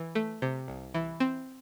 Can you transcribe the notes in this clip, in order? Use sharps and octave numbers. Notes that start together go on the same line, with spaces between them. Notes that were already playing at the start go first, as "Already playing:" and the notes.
Already playing: E3
A3
C3
C2
E3
C4